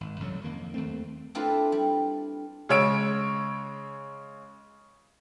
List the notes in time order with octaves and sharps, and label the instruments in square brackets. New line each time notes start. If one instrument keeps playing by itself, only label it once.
[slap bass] G#1
C2 F#2 A2 F#3
F2 D#3 A#3
D#2 A3 C4
[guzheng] C4 D4 E4 F4 A4 B4
G3
[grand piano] C#3 G#3 C#5 E6 D7